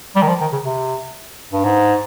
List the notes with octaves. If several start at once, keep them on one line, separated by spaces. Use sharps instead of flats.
G3
D#3
F3
D#3
C#3
C3
G2
G#2